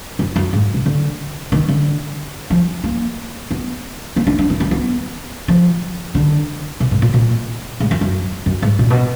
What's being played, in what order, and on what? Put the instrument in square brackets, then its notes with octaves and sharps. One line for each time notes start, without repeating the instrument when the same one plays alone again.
[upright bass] F#2
F#2
G#2
B2
D3
D#3
D3
F3
A#3
B3
A#3
D4
D4
B3
B3
B3
F3
D3
B2
G#2
A#2
A#2
G#2
F2
F#2
F#2
G#2
A#2
B2